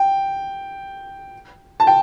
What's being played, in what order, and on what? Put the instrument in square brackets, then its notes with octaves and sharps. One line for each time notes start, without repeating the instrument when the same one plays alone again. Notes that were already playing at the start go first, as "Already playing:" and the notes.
Already playing: [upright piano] G5
A5
G5